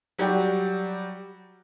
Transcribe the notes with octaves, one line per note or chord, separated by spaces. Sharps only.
F#3 G3 F#4 G4